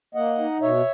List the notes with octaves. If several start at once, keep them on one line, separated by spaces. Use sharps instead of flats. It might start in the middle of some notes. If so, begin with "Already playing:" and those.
A#3 D#5 F#5
D#4
B2 C#5 E5